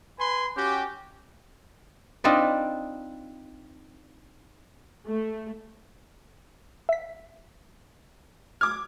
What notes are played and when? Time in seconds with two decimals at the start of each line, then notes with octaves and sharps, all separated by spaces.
0.19 B4 G#5 B5 C6
0.56 C#4 F#4 G4
2.24 C4 D4 D#4 F4 B4 D5
5.08 A3
6.89 E5 B6
8.61 D6 F6 G#6